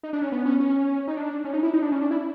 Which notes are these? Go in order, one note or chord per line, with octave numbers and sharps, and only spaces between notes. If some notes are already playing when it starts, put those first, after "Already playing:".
D#4
D4
C#4
B3
C#4
C#4
D#4
D4
C#4
D#4
E4
D#4
D4
C#4
D4
E4